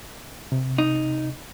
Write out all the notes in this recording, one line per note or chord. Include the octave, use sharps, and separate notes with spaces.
C3
D#4